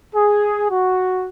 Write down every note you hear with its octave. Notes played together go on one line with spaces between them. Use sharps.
G#4
F#4